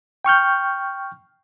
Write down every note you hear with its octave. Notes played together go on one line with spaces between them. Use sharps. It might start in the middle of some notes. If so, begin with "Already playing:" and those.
G5 C#6 F6 G6